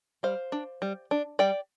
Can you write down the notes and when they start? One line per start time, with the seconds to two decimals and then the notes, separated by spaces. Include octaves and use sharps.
0.23 G3 C5 F5
0.52 D4
0.82 G3
1.11 D4
1.39 G3 D5 G5